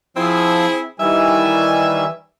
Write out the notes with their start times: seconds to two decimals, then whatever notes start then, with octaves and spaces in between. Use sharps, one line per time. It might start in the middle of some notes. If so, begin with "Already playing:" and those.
0.17 F3 C4 E4 G#4
1.00 D#3 E3 G3 E5 G#5